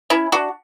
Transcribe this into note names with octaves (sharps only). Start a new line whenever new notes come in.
C#4 E4
D4 F#4